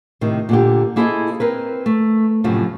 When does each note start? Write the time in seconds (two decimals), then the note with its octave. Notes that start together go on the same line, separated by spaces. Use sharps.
0.21 A2 C3 D#3
0.49 A#2 D3 G4
0.96 A#3 E4 G#4 A4 C5 D#5
1.40 C4 A#4 B4
1.86 A3
2.44 F#2 A2 C3 F3